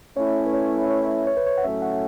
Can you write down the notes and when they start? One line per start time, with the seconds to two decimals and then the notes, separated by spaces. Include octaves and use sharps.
0.17 A3 C#4 E4 C#5
0.46 B4
0.54 C#5
0.85 E5
0.90 C#5
1.27 C#5
1.37 B4
1.47 C#5
1.58 F#5
1.64 A2 F#3 A3 C#4 E5
1.82 F#5